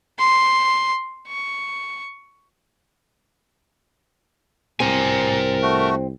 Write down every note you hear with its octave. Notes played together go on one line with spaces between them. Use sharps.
C6
C#6
C2 C4 A#4 G#5
A3 F#4